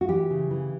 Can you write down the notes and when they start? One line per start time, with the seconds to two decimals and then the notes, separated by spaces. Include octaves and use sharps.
0.01 F#4
0.08 E3 G4
0.30 C#3
0.51 E3